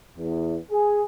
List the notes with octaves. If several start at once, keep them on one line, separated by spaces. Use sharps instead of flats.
E2
G#4